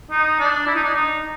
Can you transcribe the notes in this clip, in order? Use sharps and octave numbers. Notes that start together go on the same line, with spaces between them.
D#4
D4
E4
D#4
D4
D#4